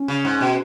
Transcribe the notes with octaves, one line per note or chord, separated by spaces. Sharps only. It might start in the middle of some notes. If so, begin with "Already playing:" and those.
Already playing: C#4
C#3
G#2
B2